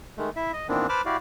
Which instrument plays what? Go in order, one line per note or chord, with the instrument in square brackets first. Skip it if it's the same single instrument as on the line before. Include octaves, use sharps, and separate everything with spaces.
[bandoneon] D#3 G#3 A3
E4 E5
D#5
A#2 D#3 E3 B3 C4 D4
B4 C5 A5 B5 D6 F6
E4 F#4 G4 D5 F5